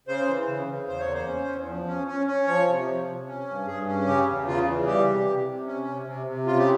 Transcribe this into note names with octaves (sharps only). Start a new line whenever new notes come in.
C#3 C5
E3
C#3
C#3
E2 C5
C#5
A#3
C5
C#4
E2
F3
C#4
C#4
C#4
F3 C#5
C3
F3
C3
C#4
G2
G2 G#4
C#4
C#3 G4
E2
C#3 F4
E3
G3 G4
C3
C3
C3
C#4
C3
C3
C3
C#3 F4
G4